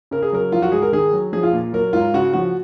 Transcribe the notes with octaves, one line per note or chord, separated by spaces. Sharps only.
C#3 A#4
G#4
F#3 A#4
F3 F4
F#4
G#2 G#4
A#4
D#3 G#4
F#3
F3 G#4
F4
A#2
F#3 A#4
G#2 F4
C#3 F#4
F3 F#4